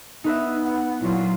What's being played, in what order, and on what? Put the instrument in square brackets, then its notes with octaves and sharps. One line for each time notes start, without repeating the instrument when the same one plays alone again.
[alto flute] B3 [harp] D#4 B4 E5
[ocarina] F#5
[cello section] A#2 F#3 F4 [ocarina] E4